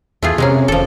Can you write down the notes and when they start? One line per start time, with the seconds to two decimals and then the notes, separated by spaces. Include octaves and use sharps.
0.23 E2 A3 F4 G#4
0.38 C3 G#3 A#3 C#4
0.68 F1 F3 A4